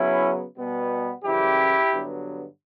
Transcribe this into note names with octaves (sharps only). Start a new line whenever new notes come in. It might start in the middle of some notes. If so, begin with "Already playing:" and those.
Already playing: C#3 F#3 B3 C#4 E4
B2 G3 B3
F#2 C#3 E3 G3 E4 G4
G2 D3 F#3 B3